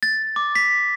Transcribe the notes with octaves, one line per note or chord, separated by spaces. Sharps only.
A6
D6
B6